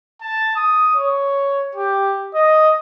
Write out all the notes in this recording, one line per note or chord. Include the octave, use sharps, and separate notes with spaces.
A5
D#6
C#5
G4
D#5